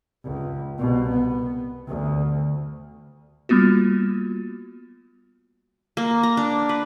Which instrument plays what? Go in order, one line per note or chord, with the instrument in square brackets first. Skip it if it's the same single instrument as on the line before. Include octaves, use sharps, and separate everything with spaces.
[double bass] C#2
C2 B2
B3
D2
[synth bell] G3 A#3 B3 F4 F#4
[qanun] A#3
A#5
D4
B4